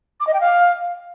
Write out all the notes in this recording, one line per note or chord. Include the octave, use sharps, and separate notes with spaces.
D6
D#5
G5
F5